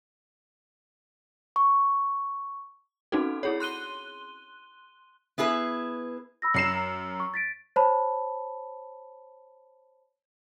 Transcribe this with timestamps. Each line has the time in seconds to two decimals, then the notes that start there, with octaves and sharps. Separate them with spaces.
1.56 C#6
3.12 C4 C#4 D#4 F#4 A4
3.43 E4 G#4 C#5
3.60 C6 F#6 D#7 G7
5.38 B3 E4 G#4 B4
6.42 B5 E6 A#6
6.54 F#2 C7 E7
6.75 A#5
7.20 C#6
7.34 A6 B6 D7
7.76 C5 C#5 A5 B5